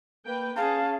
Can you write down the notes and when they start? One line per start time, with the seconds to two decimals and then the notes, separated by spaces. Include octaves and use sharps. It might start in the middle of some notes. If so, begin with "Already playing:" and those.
0.25 A#3 B4 G5
0.56 C#4 G#4 F5 A5